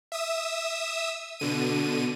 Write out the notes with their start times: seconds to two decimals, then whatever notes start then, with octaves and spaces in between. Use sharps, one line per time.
0.12 E5 D#6 E6
1.40 B2 D3 D#7